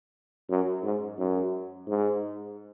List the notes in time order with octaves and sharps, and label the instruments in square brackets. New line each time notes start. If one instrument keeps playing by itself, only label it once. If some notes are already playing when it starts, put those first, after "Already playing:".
[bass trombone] F#2
G#2
F#2
G#2